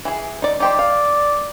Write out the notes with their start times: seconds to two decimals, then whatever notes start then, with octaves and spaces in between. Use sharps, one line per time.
0.05 E3 G#4
0.42 D#4 D5
0.60 D#4 G4 C5 D5
0.79 F5